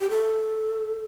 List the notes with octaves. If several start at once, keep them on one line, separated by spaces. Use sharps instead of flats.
G4
A4